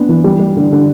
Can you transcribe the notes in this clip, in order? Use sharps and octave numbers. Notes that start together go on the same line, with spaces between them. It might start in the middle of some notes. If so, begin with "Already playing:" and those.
Already playing: B3 D4
E3
G3
G3
D3
D3